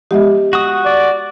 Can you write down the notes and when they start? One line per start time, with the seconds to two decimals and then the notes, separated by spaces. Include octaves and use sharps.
0.11 F3 G#3 B3 G4 D#5 E5
0.53 F#4 D#6
0.85 D5